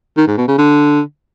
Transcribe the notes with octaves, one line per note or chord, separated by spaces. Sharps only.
D#3
G#2
B2
C#3
D3